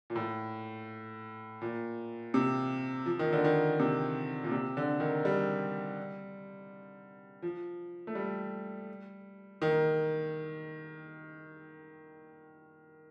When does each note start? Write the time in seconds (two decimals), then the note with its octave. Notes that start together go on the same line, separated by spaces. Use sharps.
0.10 A#2
0.16 A2
1.62 A#2
2.34 C3
3.06 F3
3.19 D#3
3.33 D3
3.44 D#3
3.80 C3
4.44 A#2
4.51 C3
4.77 D3
5.00 D#3
5.25 G3
7.42 F3
8.07 A3
8.15 G3
9.62 D#3